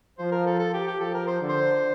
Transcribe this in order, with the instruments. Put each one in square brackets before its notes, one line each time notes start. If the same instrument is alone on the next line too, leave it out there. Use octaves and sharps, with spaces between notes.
[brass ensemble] F3 [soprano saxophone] C5
[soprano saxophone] A#4
A4
A4
G4
G4
[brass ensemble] F3 [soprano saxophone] A4
[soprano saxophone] A#4
C5
[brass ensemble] D3
[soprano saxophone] C5